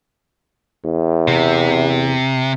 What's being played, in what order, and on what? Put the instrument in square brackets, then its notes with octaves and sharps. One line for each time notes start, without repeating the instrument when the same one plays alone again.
[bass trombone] E2
[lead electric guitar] C3